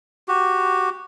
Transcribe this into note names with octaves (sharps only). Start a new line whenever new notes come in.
F#4 G4